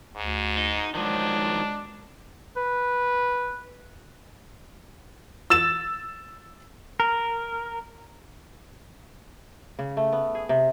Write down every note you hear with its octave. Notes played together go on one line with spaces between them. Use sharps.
D2 G#2
D#4
D#3 F3 F#3 G#3 D4
B4
E6 A6 E7
A#4
C#3
A3
B3
G#4
C3